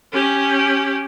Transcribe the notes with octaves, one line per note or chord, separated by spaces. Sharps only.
C#4 G4